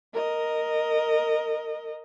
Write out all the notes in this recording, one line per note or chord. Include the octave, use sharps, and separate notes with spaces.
A#4 D#5